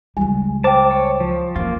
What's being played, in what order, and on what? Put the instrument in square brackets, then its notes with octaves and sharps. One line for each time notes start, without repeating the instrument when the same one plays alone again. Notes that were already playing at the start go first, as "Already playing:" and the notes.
[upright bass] C#2 G3 [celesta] G#5
[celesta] C5 G5 [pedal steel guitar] A5 D6
[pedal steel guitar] C#5
F3
[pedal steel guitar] A#3 F4 [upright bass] C#4